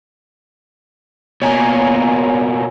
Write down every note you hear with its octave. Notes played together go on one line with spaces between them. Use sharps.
B2 A#3 C#5 G#5 A#5